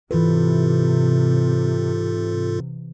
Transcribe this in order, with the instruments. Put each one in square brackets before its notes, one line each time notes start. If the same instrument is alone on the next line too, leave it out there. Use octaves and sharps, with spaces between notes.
[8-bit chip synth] G#2 F4 A4 [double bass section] C3 [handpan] E3 B4